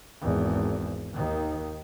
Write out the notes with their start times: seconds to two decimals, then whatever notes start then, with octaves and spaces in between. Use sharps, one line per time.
0.21 G#1 E2
1.14 D#2 D#3